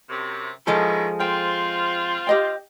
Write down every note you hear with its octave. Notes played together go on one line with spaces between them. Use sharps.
F#2 C3
D#3 F3 G#3 C#4 E4 A4
C4 F4 G5
G4 D#5 G5